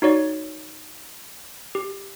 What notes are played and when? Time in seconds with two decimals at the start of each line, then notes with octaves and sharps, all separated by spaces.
0.02 D#4 F#4 C#5 D5
1.75 G4